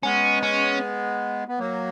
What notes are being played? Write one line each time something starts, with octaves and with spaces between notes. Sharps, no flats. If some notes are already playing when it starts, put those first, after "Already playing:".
G#3 B3 C#4
C#4
B3
F#3 A#3